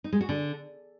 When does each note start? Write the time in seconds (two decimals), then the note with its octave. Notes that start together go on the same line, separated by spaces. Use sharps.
0.04 D#4
0.12 G#3
0.21 F#4
0.29 D3